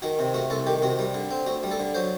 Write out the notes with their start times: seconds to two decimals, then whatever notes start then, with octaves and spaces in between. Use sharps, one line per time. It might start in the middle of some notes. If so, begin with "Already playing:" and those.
0.02 D#3 F#4
0.19 C3
0.34 A3 F#4
0.50 C2 A4
0.67 D#3 G4
0.82 C3 F#4
0.99 G3
1.14 D3
1.31 C4
1.46 D2 F#4
1.63 G3
1.71 A4
1.80 D3
1.94 F#3 C5